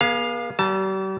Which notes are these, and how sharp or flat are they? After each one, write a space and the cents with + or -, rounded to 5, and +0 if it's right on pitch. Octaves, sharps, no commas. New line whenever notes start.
B3 -45 G#4 +0 F5 +0
G3 -40 A5 +5